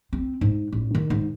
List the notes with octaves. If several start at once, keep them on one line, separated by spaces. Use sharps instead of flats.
C4
G#2
A1
D#3
G#2